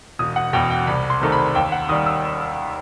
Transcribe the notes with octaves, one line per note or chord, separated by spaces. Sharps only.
E1 D#6
F#5
E2 B2 G5
G5
C2 B5
C6
C3 D#3 A3
B5
D#2 G5
F#5
D#3 G3 D#6
E6